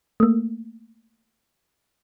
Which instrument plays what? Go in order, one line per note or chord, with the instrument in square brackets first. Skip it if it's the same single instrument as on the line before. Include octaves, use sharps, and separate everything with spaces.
[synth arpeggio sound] A3 A#3